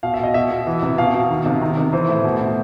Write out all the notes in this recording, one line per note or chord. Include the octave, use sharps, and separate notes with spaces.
B2 F5
E5
B2 D#5
B2 E5
B2
E3
C3
B2 F5
B2
D#3
C3
D#3
C3
E3 C5
A2
B2
B2